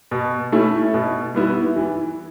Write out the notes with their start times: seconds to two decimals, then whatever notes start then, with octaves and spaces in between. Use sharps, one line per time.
0.11 B2
0.52 A3 C#4 E4
0.94 B2
1.35 G3 B3 E4
1.76 E3